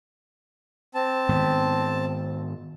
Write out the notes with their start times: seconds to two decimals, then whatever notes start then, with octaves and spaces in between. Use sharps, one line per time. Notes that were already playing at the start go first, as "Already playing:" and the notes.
0.95 C4 A5
1.29 G#2 D#3 B3